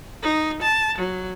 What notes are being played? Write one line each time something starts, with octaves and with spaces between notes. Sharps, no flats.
D#4
A5
F#3